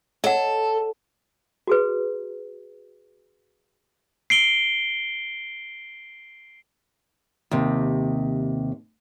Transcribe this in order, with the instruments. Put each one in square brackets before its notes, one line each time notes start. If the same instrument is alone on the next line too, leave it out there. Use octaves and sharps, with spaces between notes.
[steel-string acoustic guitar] A4 [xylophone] C#5 A5 [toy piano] D#5 F#5
[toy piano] F#4 G#4 B4
[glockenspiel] C7 D7 G7
[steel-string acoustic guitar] D#2 C3